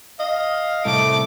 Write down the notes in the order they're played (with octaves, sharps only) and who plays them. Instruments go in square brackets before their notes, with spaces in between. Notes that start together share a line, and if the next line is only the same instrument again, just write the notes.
[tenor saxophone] D#5 [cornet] F5
[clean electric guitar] C2 A2 [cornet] A3 [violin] D6